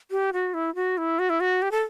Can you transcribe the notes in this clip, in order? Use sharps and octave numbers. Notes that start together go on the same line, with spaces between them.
G4
F#4
E4
F#4
E4
F#4
E4
F#4
G4
A4